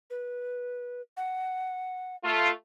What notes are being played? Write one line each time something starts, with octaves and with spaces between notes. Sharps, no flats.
B4
F#5
A3 F4